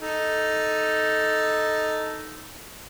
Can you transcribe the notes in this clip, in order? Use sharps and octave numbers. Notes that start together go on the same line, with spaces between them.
D#4 A4